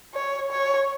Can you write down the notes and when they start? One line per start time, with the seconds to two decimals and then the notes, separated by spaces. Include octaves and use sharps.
0.14 C#5
0.51 C#5